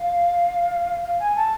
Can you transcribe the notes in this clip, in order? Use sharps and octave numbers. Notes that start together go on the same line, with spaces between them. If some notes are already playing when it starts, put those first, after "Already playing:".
Already playing: F5
F5
G#5
A5